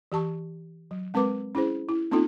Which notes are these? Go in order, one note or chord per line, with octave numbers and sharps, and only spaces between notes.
E3 G4 A5 C#6
F#3
G#3 C4 A#4 B4 D6
C#4 E4 G#4 C5
E4
A#3 C4 C#4 D#4 F4 A4